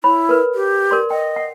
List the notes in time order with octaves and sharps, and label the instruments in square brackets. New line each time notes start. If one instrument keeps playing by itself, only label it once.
[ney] E4 [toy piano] C#5 B5
[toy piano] A#4 B4
[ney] G4
[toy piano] A#4 D5 C6
[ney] D#5 [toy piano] G5
[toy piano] F#5